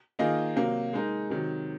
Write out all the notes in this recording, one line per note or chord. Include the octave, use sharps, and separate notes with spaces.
D#3 A#3 F4 G#4 D#5
C3 F#3 A#3
G#3 D#4 A#4
C3 D#3 F#3